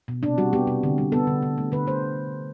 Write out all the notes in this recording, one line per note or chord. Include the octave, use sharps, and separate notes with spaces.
B2
C3 D4
G3 F#4
B3 G4
C3
D3
G3
B3 A4
D3
D3
A3
D3 B4
A3 C5